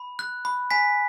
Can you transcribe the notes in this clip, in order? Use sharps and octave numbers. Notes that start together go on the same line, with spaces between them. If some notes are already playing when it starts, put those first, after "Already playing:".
Already playing: B5
F#6
B5
G#5 B6